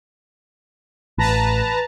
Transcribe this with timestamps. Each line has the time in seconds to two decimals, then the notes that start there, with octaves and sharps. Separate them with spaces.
1.18 A1 B4 A5 A#5